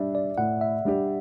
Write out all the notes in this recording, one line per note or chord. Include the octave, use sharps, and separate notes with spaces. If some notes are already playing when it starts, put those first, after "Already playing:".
Already playing: G3 D4 G4 E5
D5
A2 F#5
E5
G3 D4 G4